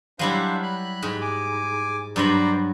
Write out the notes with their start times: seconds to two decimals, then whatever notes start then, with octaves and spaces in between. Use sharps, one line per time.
0.19 F#3 G3 D4 E4 C5 F5
0.63 B5 F#6
1.03 G#2
1.21 G#5 D6
2.16 G2 F#3 C5 D5 A#5 B5